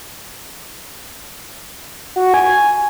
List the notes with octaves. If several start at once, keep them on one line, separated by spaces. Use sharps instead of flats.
F#4
G#5